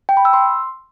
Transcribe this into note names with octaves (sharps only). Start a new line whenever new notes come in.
G5
B5
E6
C6